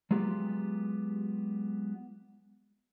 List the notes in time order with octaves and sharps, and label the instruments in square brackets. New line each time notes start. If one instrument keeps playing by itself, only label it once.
[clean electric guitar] F#3 G#3 B3 F4 G4